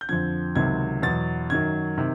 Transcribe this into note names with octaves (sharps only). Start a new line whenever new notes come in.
G6
F2 D3 F3 G#6
C#2 C3 D#3 F#3 G#6
E2 B2 F#3 A6
F#2 D#3 F#3 G#6
C3 D#3